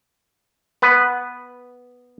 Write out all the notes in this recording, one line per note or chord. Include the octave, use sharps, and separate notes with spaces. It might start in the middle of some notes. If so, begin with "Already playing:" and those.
B3 B4